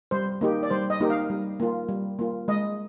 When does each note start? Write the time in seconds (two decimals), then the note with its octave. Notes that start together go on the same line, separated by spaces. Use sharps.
0.11 G3 C5
0.41 A#3 D#4 G4
0.63 D5
0.70 G3 C5
0.90 D#5
1.00 A#3 D#4 G4
1.10 F5
1.30 G3
1.60 A#3 F4
1.89 G3
2.19 A#3 F4
2.48 G#3 D#5